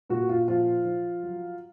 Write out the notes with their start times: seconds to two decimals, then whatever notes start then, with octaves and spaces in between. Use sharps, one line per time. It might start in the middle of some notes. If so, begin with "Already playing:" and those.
0.10 A#2 F#4
0.29 F4
0.47 F3 F4
0.85 F3
1.23 F#3